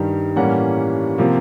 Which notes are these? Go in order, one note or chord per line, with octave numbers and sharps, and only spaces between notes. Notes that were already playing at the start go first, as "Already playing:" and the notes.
Already playing: G2 D#3 G3
A2 E3 G3 A#3 C#4 F#5
C3 F3 A#3